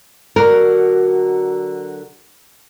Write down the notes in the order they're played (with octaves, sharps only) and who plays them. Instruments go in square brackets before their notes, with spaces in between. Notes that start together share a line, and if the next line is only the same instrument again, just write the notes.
[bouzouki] D3 F#3 F#4 [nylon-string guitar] A#4